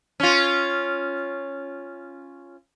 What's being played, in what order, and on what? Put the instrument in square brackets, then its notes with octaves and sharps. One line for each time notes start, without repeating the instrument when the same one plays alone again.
[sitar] C#4 F4